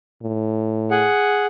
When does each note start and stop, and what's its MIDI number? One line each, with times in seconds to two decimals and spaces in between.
0.23 1.08 45
0.91 1.46 68
0.91 1.46 78